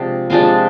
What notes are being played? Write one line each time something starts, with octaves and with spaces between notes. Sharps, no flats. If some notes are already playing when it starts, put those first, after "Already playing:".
Already playing: C3 F3 G#3 D4
C3 F3 G#3 D4 F5